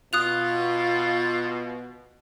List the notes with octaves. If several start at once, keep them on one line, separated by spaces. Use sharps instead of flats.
B2 F4 D#6 F#6 F7